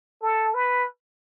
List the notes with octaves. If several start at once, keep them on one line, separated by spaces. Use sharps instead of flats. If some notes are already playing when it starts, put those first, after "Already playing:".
A4
B4